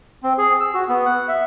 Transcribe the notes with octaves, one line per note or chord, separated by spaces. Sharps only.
C4
G#4
E6
F#4
B3
F#5
E5